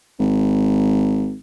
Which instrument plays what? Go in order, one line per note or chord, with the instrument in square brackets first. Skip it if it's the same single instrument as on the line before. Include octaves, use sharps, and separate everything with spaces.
[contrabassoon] G#1